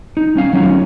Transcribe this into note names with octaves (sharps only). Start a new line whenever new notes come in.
D#4
G3 C#4 F5
F#3 C#4 D#4 F4